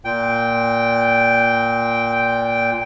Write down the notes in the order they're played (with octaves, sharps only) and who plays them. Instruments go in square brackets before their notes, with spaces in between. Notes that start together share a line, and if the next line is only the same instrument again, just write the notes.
[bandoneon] A#2 G5